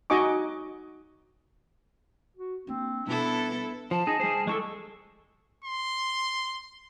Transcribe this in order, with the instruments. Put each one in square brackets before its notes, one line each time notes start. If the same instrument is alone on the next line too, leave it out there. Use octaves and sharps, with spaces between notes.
[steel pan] D#4 F#4 D#5 G#5 C#6 D6
[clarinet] F#4
[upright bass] A#3 D4 [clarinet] C4
[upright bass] B2 G3 [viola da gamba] B3 E4 A4 [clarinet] D4
[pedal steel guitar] F3 [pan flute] A5
[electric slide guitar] D#4 [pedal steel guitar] G#4
[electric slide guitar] G3 C5 [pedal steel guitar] G#4
[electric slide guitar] G3 E4 A4 [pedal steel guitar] G#3 A5 E6 [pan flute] C#6
[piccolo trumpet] C6